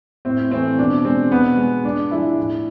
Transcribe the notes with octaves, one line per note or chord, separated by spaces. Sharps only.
A2 C4
E3 A3 C4
B2 D4
G#3 C4
B2 B3
G#3
G#2 D4
F3 G#3 E4
A2